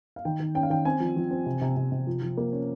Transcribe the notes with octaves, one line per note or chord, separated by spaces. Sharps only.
F5
D#3 G5
D#3
C#4 G5
F5
D#3 G5
C4 G#5
F3
F3
C4
C3
C3
C3
C3
F3
F3
A#3
C#4